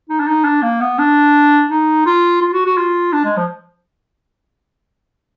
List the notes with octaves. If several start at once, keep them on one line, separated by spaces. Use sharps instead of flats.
D#4
D4
D#4
D4
A#3
B3
D4
D#4
F4
F4
F#4
F#4
F4
D4
G#3
F3